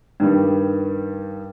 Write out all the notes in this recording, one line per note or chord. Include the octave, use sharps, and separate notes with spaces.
G2 D#3 G3